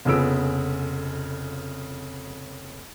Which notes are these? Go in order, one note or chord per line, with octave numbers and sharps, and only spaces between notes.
F1 F2 C#3 B3 E6 D7